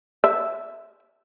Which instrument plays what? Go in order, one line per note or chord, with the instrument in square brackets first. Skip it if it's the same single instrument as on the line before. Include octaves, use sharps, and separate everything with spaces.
[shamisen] E5